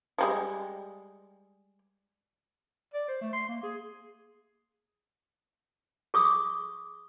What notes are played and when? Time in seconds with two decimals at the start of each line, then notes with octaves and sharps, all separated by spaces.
0.18 F3 G3 G#3
2.94 D5
3.08 C5
3.21 A3
3.33 C6
3.48 A#3
3.63 G#4
6.14 G#4 C#6 D#6